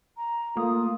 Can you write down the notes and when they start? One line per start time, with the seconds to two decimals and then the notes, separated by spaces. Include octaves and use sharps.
0.17 A#5
0.57 A3 A#3 F4 D#6